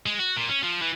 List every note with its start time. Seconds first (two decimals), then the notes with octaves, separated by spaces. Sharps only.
0.06 G#3
0.20 F#4
0.36 A#2
0.49 C#4
0.63 F3
0.82 E3